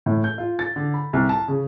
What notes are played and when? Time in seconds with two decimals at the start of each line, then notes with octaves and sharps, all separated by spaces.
0.06 A2
0.24 G6
0.38 F4
0.59 A6
0.76 D3
0.94 B5
1.13 C2
1.29 A5
1.48 C#3